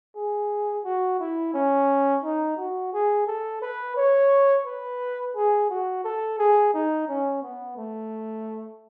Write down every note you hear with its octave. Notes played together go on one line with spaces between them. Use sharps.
G#4
F#4
E4
C#4
D#4
F#4
G#4
A4
B4
C#5
B4
G#4
F#4
A4
G#4
D#4
C#4
B3
A3